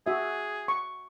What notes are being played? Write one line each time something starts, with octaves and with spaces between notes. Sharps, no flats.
F#4 G#4 E5
C#6